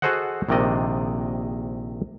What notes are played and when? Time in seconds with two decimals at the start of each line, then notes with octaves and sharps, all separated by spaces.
0.02 F#4 G#4 A4 C5 D#5 F#5
0.49 A#1 C3 D#3 D5 D#5